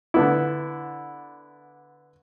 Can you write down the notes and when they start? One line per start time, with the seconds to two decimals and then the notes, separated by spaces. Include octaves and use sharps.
0.14 D3 B3 E4